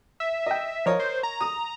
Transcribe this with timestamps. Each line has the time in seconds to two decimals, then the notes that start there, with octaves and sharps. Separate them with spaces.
0.20 E5
0.46 D#5 G5
0.86 F3 A#4 C#5 D#5
1.00 C5
1.23 A#5
1.41 D#6